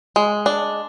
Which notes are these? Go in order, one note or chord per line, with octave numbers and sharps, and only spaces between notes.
G#3
D4